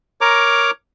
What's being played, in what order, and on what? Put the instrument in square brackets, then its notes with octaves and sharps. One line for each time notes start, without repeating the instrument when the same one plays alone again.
[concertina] A#4 C#5 A#5 D6